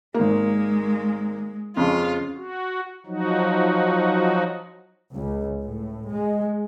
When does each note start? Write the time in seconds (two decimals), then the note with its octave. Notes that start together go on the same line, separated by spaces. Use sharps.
0.14 G#1 G#3 A#3
1.77 F2 C#3 F4
2.37 F#4
3.06 F3 F#3 D#4 F#4
5.13 C#2
5.61 A2
6.09 G#3